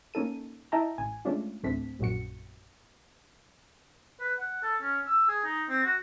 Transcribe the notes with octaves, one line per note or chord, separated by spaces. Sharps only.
A#3 C#4 D#4 A4 D#7
E4 D#5 E5 G5 A5 A#5
A1 G#5
G#3 A3 C#4 D4 F4
A1 D2 A3 C4 D4 B6
A#1 F#2 A#2 F#4 C#7
B4
F#5
A4
C#4
E6
G#4
D#4
C4
F#4